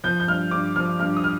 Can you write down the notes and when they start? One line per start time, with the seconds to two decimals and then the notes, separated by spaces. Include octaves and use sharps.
0.04 F3 G6
0.20 G6
0.28 G2 F6
0.51 G2 D6
0.76 F3 F6
0.99 G2 F6
1.17 D#6
1.24 F6